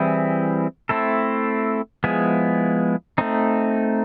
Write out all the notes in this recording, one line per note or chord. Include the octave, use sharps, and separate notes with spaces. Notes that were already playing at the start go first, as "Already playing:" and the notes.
Already playing: E3 G3 C4 E4 G#4
A3 C4 E4 A4
F3 G#3 B3 E4 G#4
A3 C4 D#4